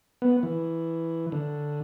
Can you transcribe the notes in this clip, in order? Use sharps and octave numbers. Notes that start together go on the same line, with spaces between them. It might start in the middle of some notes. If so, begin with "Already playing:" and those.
B3
E3
D3